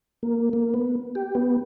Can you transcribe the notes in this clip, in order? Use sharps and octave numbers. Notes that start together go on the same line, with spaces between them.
A#3
A#3
B3
G4
B3